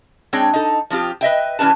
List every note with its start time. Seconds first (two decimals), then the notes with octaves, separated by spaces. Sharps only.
0.33 G#3 C4 D4 C#5 G5
0.53 D#4 A4
0.90 F3 C4 F4 G4
1.21 B4 D#5 E5 G5
1.59 E3 G3 C#4 B4 A5